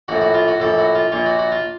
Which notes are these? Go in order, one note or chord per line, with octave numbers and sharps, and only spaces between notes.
A#1 A2 F#4
F#4
F4
F#4
A#1 A2 A4
F#4
F4
A#1 A#2 F4
F#4
F#4
F4